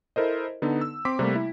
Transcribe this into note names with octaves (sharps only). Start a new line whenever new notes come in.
E4 A4 A#4 C5 D#5
D3 B3 D#4 A4
E6
C4 C6 D6 B6
C3 G3 A3 A#3
E4